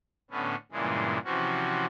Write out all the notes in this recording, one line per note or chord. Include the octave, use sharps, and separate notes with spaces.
A2 D3 B3 C#4
G2 A#2 C#3 E3 G#3
C3 E3 F3 C#4 F#4